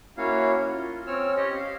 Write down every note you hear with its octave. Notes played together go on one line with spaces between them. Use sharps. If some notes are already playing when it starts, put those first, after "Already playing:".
A#3 C#4 E4 F#4 C#5 F5
F4
C4 C#4 C#5 E6 F6
G4 C#5 D#5
F5